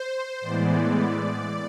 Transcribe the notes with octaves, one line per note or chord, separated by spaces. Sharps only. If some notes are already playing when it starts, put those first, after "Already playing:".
Already playing: C5
A2 E3 G#3 B3 D5